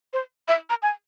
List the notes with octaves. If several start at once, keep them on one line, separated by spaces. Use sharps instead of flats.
C5
E5
A#5
G#5